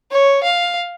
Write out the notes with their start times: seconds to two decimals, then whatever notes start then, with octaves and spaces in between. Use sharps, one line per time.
0.11 C#5
0.43 F5